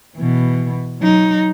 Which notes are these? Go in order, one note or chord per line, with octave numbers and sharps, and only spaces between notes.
B2 E3
F#3 D#4